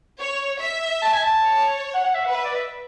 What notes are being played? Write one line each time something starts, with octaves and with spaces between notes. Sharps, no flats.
C#5
E5
A5
G#5
A5
C#5
F#5
F#5
E5
B4 F#5
E5
D5
E5